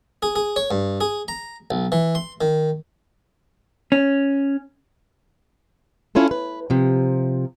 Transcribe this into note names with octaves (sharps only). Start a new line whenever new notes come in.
G#4
G#4
C#5
G2
G#4
A#5
B1
E3
C6
D#3
C#4
C#4 E4 F4 A4
B4
C3 F3